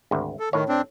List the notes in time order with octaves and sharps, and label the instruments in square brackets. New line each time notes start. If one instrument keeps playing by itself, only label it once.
[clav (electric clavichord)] G#1 D2
[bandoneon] A4
[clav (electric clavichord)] A2 C#5 [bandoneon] D#3
[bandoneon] C4 D4